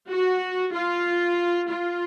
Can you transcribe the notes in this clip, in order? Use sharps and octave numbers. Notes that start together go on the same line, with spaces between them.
F#4
F4
F4